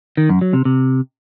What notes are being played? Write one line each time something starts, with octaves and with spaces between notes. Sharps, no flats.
D#3
F#2
F#3
C3
C3